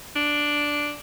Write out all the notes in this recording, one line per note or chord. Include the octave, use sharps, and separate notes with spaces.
D4